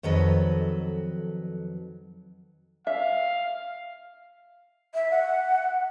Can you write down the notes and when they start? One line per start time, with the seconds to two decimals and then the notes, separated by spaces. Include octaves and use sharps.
0.03 F2 D#3 F#3 A4 B4 D#5
2.87 E5 F5
4.94 E5
5.11 F#5